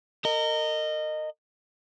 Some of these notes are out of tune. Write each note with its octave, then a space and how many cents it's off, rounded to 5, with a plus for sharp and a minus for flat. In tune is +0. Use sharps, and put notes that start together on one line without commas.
A#4 -30 D#5 -15